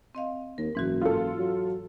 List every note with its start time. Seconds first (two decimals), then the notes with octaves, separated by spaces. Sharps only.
0.15 C4 D#5 F5
0.58 D#2 A#4
0.75 F#1 G#2 E3 F#4
1.02 F4 A4
1.39 F#3